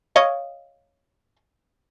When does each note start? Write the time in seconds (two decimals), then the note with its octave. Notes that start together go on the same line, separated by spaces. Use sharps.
0.16 C#5 D#5 F5